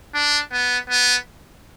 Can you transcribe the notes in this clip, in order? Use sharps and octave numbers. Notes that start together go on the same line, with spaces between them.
D4
B3
B3